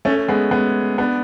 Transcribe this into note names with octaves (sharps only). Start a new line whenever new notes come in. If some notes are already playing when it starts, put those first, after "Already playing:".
A3 C#4
G#3 B3
G#3 B3
B3 D4